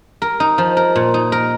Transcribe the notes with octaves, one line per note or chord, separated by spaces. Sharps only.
A#4
D#4
F3
A#4
A#2
D#4
A#4